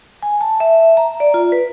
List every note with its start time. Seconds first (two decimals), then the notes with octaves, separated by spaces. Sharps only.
0.23 G#5
0.41 A5
0.60 E5
0.97 A#5
1.20 D5
1.34 F4
1.52 B4